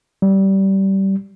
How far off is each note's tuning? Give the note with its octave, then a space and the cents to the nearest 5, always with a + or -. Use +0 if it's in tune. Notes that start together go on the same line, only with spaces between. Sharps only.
G3 -20